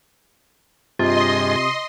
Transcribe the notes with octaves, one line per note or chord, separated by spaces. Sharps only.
G2 C3 F4 G#4 D#5 C6